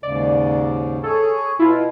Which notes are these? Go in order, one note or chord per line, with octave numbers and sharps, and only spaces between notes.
D#2 G#2 C#3 D5
G#4 A4 C#5
B2 E4 F4